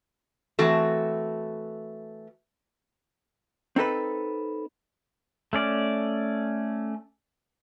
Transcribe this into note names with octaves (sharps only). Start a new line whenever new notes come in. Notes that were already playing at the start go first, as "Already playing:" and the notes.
E3 A3 C4 F#4 A4
C4 D#4 A4 B4
A3 C#4 D5